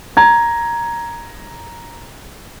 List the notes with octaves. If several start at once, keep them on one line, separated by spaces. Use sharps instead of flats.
A#5 G#6